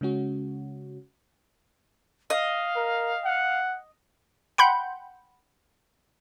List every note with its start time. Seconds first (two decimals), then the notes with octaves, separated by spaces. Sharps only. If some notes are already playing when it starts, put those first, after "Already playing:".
0.01 C#3 G#3 C#4 F#4
2.30 D#5 F5
2.76 A#4
3.25 F#5
4.58 F#5 G5 B5 C6 G6